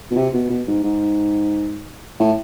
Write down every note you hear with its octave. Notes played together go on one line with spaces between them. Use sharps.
B2
C3
B2
B2
G#2
G#2
A2